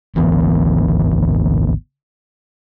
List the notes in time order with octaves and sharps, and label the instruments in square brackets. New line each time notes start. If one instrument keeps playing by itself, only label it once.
[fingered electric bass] G#1 D2 E3 B3